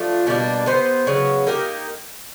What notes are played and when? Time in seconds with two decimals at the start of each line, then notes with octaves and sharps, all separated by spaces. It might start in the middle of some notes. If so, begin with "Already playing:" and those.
Already playing: F3 A3 D4 F4
0.27 B2 G3 A#3 D4
0.66 B3 D#4 G4 C5
1.07 C#3 F#3 B3
1.47 A#3 D#4 G4 A#4